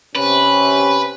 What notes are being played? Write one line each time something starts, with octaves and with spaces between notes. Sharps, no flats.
C3 C#4 B4